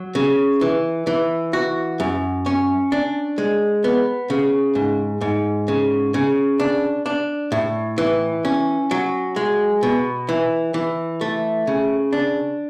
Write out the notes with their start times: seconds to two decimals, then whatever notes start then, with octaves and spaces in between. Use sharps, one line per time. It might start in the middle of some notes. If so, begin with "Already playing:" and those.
Already playing: F#3
0.15 C#3
0.61 E3
1.07 E3
1.53 F#4
2.00 F#2
2.46 C#4
2.92 D4
3.38 G#3
3.84 B3
4.30 C#3
4.75 G#2
5.21 G#2
5.68 C#3
6.14 C#3
6.60 D4
7.06 D4
7.52 A2
7.98 E3
8.45 C#4
8.91 F#3
9.36 G#3
9.83 B2
10.29 E3
10.74 E3
11.21 A3
11.67 C#3
12.13 D4